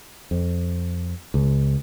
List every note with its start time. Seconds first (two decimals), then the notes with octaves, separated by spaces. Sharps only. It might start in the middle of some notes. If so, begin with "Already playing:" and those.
0.31 F2
1.34 C#2